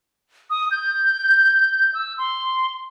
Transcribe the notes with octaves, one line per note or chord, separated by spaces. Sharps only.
D#6
G6
E6
C6